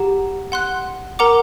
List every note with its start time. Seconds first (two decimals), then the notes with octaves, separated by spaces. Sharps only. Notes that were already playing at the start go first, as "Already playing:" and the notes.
Already playing: G4 F#5 A#5
0.52 F#5 C6 F#6
1.19 A#4 F#5 A#5 D6